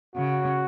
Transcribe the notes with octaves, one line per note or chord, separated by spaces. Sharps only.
C#3 F#4